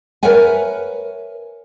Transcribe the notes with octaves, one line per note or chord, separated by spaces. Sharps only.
A#4 B4 C#5 E5 F#5 G#5